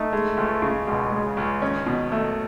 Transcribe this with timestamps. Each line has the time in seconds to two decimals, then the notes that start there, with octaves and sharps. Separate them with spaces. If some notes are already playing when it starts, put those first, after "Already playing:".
Already playing: A3 D#4
0.13 G#3
0.37 C#2
0.62 C#3
0.87 C#2 B2
1.12 G#3
1.25 C#3
1.37 C#2
1.62 D#3 C#4
1.86 B2
2.12 A3